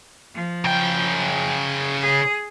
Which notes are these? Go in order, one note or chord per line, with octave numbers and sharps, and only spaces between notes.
F3
C#3 G5
G#4